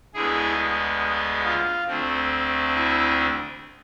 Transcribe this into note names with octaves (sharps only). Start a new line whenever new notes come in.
D2 D3 G#3 B3 E4 G#4
F4
D2 D3 A3 C4
E4